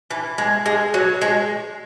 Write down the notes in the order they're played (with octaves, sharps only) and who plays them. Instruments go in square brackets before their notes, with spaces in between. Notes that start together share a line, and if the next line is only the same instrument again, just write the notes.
[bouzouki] E3
G#3
G#3
F#3
G#3